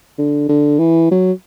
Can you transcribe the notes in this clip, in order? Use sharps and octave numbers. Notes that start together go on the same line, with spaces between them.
D3
D3
E3
F#3